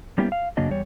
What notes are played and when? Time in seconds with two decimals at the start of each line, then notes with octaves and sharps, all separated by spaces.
0.18 G3 A#3 B3 C#4 E4 G4
0.32 F5
0.57 F#2 C#3 F#3 A#3 D4 D#5
0.70 E2 G3 C#5